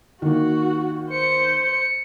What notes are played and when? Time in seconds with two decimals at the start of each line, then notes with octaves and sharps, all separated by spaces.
0.22 D#3 A#3 F#4
1.10 C5 C#7